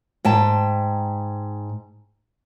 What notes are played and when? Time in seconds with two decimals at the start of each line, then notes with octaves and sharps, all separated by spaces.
0.25 G#2 G5 A5